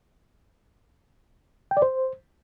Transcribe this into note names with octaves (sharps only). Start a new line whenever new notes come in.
G5
D5
C5